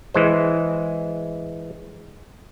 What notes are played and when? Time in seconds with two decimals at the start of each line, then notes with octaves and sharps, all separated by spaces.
0.14 E3 G#3 C5